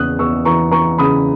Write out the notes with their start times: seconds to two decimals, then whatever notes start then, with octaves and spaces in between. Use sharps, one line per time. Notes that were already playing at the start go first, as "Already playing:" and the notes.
Already playing: E2 C#3 D#6 F#6
0.19 E2 C#6 E6
0.45 E3 A#5 C#6
0.71 E3 A#5 C#6
0.98 C#3 B5 D#6